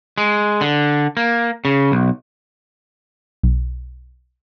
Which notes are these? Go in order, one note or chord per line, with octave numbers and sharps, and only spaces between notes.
G#3
D3
A#3
C#3
B1
B1